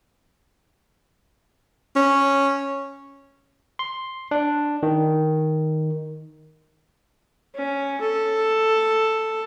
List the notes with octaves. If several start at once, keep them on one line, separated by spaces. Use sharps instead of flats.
C#4
C6
D4
D#3
C#4
A4